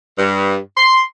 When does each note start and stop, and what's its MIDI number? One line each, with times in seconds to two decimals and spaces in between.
0.18 0.57 43
0.77 1.02 84